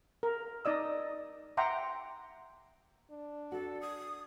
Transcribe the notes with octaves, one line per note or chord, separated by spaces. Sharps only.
A#4
D#4 D5 D#5 E6
E5 F#5 G5 A#5 C6 D6
D4
F#4 A4
D#6